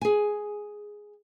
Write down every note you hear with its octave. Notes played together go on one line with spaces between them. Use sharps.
G#4 G#5